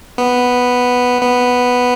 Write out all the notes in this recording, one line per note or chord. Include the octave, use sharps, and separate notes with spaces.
B3
B3